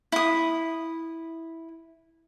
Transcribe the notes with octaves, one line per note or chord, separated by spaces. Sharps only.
E4 D#6